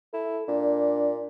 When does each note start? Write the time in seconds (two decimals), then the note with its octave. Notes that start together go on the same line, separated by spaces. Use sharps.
0.14 E4 A4
0.48 A#2 D4